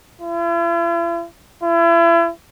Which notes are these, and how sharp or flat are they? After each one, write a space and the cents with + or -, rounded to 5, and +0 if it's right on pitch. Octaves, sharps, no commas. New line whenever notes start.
E4 +45
E4 +35